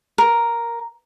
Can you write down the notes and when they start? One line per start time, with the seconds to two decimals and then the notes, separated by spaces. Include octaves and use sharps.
0.18 A#4